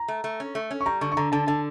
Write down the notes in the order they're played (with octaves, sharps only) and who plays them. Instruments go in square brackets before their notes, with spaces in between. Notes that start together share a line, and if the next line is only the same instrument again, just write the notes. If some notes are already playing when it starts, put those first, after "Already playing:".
Already playing: [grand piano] A#5
[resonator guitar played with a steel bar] A3
A3
C#4
A3
C#4
[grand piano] C#6
[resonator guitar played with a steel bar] G3 [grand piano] A#5
[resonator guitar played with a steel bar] D3 [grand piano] C#6
[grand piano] C#6
[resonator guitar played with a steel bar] D3 [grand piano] A#5
[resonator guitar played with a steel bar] D3 [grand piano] A5
[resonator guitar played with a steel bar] D3 [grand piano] A5